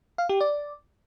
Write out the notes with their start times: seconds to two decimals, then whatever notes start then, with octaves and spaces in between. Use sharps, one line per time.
0.18 F5
0.29 G4
0.41 D5